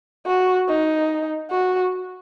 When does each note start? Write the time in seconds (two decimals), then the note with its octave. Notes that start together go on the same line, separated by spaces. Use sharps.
0.27 F#4
0.68 D#4
1.51 F#4